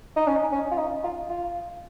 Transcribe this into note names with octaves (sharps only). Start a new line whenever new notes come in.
D#4
C#4
C#4
F4
D#4
F4
F4